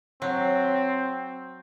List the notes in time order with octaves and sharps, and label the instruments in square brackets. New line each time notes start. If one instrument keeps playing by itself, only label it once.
[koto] F#3 [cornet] C4